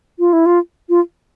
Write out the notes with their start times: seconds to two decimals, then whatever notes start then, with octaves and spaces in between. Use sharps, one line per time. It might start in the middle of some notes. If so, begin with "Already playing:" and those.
0.19 F4
0.33 E4
0.46 F4
0.89 F4